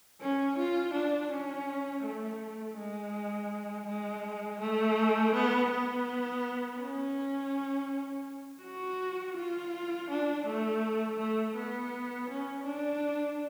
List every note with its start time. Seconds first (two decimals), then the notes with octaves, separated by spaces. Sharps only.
0.21 C#4
0.58 F4
0.94 D4
1.31 C#4
2.04 A3
2.77 G#3
3.87 G#3
4.60 A3
5.34 B3
5.71 B3
6.79 C#4
8.63 F#4
9.37 F4
10.10 D4
10.46 A3
11.19 A3
11.56 B3
12.30 C#4
12.67 D4